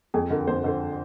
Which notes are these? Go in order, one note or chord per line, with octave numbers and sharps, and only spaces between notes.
F2 G#4
D3 A#4
F2 C5
D3 C5